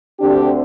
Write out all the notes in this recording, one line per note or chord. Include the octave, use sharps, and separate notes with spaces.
D2 D3 C4 D4 G4